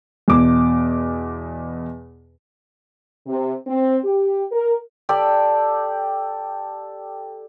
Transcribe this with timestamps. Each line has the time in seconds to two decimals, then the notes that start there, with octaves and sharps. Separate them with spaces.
0.28 E2 B2 D6
3.27 C3
3.67 C4
4.04 G4
4.52 A#4
5.09 G4 A4 D5